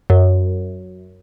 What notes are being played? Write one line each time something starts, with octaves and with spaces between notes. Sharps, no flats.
F#2